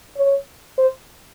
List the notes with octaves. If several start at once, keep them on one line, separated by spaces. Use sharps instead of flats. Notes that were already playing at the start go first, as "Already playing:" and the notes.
C#5
C5